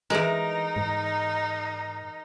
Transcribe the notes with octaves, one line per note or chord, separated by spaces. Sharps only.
E3 G#3 D#4 A#4
G#2